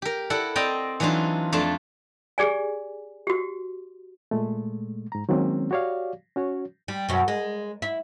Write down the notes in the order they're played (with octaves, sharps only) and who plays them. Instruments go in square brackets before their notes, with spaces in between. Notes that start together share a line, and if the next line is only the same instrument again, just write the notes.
[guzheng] G4 A#4
E4 A4 D5 F#5
C4 D5 D#5 G5 A#5
E3 F#3 D4 D#4 F4
F2 A3 D4 F4 A5
[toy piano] G4 G#4 D5 G#5
F#4 G4
[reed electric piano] A#2 G#3 A3
G#2 A#5
D#3 F#3 G#3 A#3 C4 C#4
F#4 G4 C#5 D5 F5
C#4 F#4 C#5
[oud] G3
F#2 B2
G#3
E4